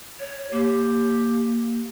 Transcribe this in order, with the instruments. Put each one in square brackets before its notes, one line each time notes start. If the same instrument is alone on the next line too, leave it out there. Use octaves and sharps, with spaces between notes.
[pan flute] C#5
[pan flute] A#3 [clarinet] G4